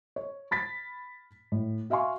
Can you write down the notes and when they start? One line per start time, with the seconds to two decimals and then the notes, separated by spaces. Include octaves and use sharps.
0.16 C#5
0.51 B5 A6 B6
1.52 A2
1.90 F#4 E5 F5 G#5 C6 C#6